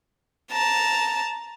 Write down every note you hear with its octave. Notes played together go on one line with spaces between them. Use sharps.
A5 A#5